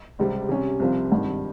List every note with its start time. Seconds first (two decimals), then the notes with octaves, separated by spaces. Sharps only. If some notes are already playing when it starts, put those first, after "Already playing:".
0.19 C#2 C3 G3 C4
0.49 C3 G3 C#4
0.80 C2 C3 F3 C4 F4
1.12 G#1 G2 D#3